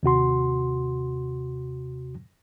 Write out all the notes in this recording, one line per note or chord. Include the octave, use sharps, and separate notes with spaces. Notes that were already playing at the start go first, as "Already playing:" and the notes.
D#2 C3 F#4 C6